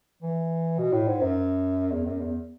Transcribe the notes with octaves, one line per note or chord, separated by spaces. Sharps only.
E3
B2
A2
G#2
F#2
E2
F#2
E2